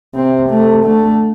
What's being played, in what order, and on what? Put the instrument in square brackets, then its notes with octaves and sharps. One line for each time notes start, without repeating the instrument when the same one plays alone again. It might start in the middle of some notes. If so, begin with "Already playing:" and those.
[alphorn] C3 [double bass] C4
[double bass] A3
[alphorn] D3 [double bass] A3